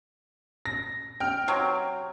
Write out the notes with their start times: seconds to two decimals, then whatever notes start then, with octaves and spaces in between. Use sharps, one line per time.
0.66 A#6
1.20 G5 F6
1.48 C3 F#3